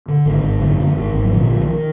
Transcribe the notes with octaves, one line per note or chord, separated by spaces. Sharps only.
D3
G#1 D#3
G#1
F#2 D3
D3
G#1 D#3
G#1
F#3
A#2 D3 F3
B1
D#3